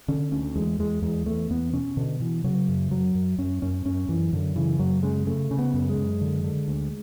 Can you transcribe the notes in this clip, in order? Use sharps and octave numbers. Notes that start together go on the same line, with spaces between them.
D3 C#4
D2 C#4
E2 G#3
E2 G#3
E2 G#3
E2 A3
E2 B3
B2 C#4
B2 D3
B2 E3
C#3 F#3
F#2
F#2 F#3
F#2
F#2 C#4
F#2 C#4
F#2 C#4
F#2 E3
F#2 D3
C#3 E3
F#2 F#3
C#3 G#3
C#3 A3
C#3
B3
F#2
G#3
F#2
D3
D3
D2